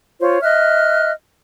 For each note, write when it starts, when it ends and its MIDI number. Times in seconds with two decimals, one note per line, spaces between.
0.20 0.41 65
0.20 0.41 72
0.20 0.41 73
0.42 1.11 75
0.42 1.11 76
0.42 1.11 89
0.42 1.11 90